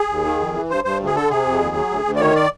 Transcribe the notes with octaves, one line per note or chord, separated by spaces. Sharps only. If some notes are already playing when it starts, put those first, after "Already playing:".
Already playing: G#4
D#2
D#3
F2
E3
G2 C5
G2 C5
D2
G#4
D3 A4
C3 G#4
F2
D#2
F#3
D2
D2
D5
D#3 C#5
D5